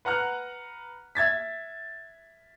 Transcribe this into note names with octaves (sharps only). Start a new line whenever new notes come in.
B4 F#5 A#5 F6 F#6
E5 G#6 A6 B6